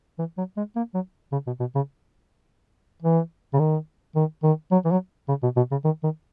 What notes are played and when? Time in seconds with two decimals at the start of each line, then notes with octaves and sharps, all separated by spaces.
0.19 E3
0.37 F#3
0.57 G#3
0.76 A#3
0.94 F#3
1.32 C#3
1.47 B2
1.60 B2
1.75 C#3
3.02 E3
3.54 C#3
3.59 D#3
4.15 D#3
4.43 D#3
4.72 F#3
4.85 E3
4.91 F#3
5.28 C#3
5.43 B2
5.57 B2
5.71 C#3
5.84 D#3
6.03 D#3